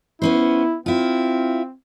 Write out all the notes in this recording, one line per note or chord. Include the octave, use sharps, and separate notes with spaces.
B3 C#4 E4 C5
C4 E4 F4